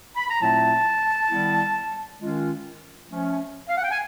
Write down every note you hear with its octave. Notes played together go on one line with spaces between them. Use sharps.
B5
A#5
A#2 F#3 A3 C4 E4 A5
D#3 G3 B3 E4
D#3 G#3 C#4 F4
F3 A3 C#4
F5
F#5
G5
G#5